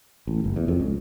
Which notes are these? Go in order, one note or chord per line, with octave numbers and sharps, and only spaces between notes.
A1
F#1
E2
F2
C#2